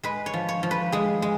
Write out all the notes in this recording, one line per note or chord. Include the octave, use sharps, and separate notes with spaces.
G#3 B4
C#5
F3
C#5
F3
B4
G#3 G#4
G#3